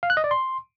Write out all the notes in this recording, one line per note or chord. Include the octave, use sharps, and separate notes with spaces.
F5
F#6
D#5
D5
C6